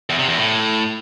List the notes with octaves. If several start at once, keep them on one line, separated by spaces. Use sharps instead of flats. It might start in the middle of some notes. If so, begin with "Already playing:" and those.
E2
C3
E2
A2